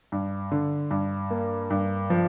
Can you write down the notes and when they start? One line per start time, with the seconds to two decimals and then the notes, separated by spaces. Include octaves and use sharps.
0.12 G2
0.51 D3
0.91 G2
1.30 A#3
1.70 G2
2.10 F3